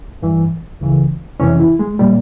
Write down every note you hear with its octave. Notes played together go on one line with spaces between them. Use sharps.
G2 E3
C#2 C#3 E3
F2 C3 E3 C#4
E4
G#3
A#2 G3